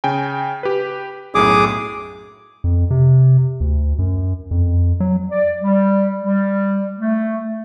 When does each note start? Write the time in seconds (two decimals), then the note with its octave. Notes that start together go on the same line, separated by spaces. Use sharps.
0.04 C#3 G5 G#5
0.63 G4 B4
1.35 B1 F#2 A2 G#4 D6 D#6
2.64 F2
2.91 C3
3.60 D2
3.99 F#2
4.51 F2
5.00 F#3
5.30 D5
5.61 G3
6.22 G3
6.99 A3